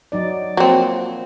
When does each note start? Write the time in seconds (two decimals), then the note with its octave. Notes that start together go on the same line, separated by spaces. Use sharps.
0.12 F#3 D#4 D5
0.57 F3 F#3 A#3 C4